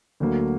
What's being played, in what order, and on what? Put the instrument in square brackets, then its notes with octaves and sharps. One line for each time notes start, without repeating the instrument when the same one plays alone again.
[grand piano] D2 D3 F#3 A#3